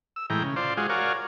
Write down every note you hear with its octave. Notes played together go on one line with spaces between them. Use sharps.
E6
A2 E3 G#3 G5 A#5
C#3
F4 C5 D5
G#3 F4 F#4 G#4
F#4 A#4 C#5 D5 F5 G#5